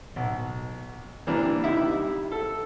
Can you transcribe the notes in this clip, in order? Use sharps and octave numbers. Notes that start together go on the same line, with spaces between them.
B1
C3 E3 G3 A#3 D4
C3 D#3 G3 D#4 E4 E5
A4